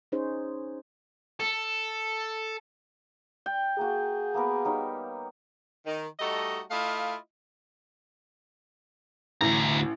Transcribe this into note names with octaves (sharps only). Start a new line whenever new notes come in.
C#4 D#4 G#4 C5 C#5
A4
G5
A#3 F#4 G#4
A#3 B3 A#4
G3 D#4 C#5
D#3
G3 A3 D#4 F#4 A4 D#5
A3 E4 F4 D#5 F5
A1 D2 A#5